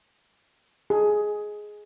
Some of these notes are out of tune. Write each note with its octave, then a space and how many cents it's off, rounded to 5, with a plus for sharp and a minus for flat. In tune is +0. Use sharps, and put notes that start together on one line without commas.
G#4 +10